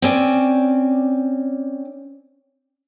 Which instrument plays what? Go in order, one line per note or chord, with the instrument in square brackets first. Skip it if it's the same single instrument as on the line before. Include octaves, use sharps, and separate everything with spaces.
[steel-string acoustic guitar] C4 C#4 D5